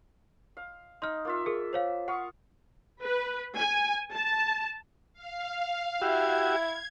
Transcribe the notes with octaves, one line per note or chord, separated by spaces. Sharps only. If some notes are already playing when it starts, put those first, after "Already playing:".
F5
D#4 C6 F6
A#3 F4 E5
G#4 A#4
C5 C#5 F5
F5 F#5 C#6 D#6
B4
G#5
A5
F5
E4 F#4 G4 E5 G#6